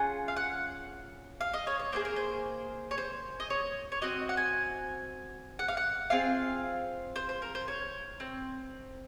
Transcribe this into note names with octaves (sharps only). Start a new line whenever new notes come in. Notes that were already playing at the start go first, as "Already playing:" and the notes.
Already playing: C#4 F4 G#4 F#5
F5
F#5
F5
D#5
C#5
C#5
A#3 F4 G#4 C5
A#4
C5
C#5
C5
D#5
C#5
C#5
C4 F#4 D#5
F#5
G#5
F#5
F5
F#5
C4 F4 G#4 F5
C5
C5
A#4
C5
C#5
C4